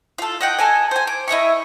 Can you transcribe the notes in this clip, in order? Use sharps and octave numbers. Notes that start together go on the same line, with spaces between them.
F4 A4
D#5 F#5 G5
A4 D#5 G#5
C5 G#5
D6
E4 D#5 E5 C#6